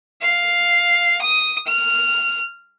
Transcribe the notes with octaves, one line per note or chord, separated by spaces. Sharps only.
F5
D#6
F6